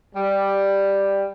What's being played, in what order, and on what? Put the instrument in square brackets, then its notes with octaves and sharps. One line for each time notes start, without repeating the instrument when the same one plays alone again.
[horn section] G3